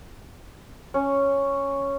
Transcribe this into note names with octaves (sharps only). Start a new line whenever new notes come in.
C#4